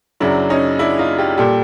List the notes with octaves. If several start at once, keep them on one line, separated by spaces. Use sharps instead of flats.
F#2 C#3 F#3 D4 E4
C#4 D#4
D4 E4
D#4 F4
F4 G4
A#2 G3 G4 A4